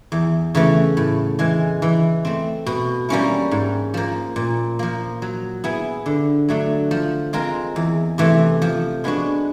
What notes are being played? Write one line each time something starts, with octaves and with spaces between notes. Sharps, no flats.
E2
C#3 E3 A3
A2
E3 G#3
E3
A3 C4
B2
G3 A#3 C#4 E4
G#2
F3 A#3
A#2
F3 A#3
F#3
B3 E4 G#4
D3
F#3 A3 D4
F3
G#3 C4 F4 A#4
E2
C3 E3 A3
F3
G#3 B3 D4 F#4